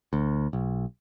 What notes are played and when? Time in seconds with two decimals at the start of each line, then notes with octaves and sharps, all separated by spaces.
0.13 D2
0.53 B1